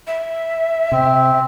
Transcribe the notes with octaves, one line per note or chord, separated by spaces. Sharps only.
E5
C3 C4